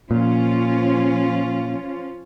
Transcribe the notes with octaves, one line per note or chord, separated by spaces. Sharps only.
A#2 F3 C#4 F4